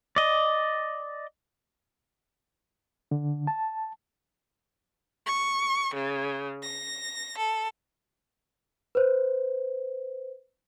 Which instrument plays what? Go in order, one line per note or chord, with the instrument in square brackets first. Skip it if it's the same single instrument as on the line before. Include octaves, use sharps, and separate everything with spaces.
[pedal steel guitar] D5 D#5
[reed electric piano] D3
A5
[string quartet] C#6
C#3
A#6
A4
[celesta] B4 C5